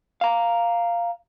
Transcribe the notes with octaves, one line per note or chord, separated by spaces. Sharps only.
F5 A#5